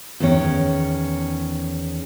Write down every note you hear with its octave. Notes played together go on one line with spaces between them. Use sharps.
E2 D#3 C#4 C#5